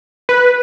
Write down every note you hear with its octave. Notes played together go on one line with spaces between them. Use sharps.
B4